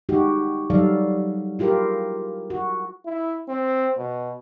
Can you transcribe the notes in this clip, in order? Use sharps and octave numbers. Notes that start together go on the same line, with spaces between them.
G#3 D#4 F#4 G4
F#3 G3 D#4 A4 D5 F5
E4 F4 G4 G#4 A#4
F#4
E4
C4
B2